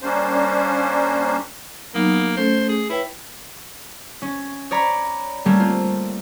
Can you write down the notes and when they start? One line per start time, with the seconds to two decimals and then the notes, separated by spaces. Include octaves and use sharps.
0.02 G3 A#3 C#4 D4 C5
1.95 F#3 A#3 B3 D#4
2.37 A3 C#4 A4 C5
2.69 G#4
2.90 E4 B4 C#5 G5
4.22 C#4
4.71 C#5 D5 A#5 B5
5.45 G3 A3 A#3 C#4
5.60 C4 F4